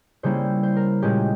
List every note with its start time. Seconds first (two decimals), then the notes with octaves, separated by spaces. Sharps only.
0.23 C#3 G3 A#3 C#4 E4 C5
0.63 C5
0.76 A#4
1.02 A#2 G#3 C#4 G4